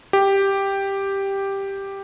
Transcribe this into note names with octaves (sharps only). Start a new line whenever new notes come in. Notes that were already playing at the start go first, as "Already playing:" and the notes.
G4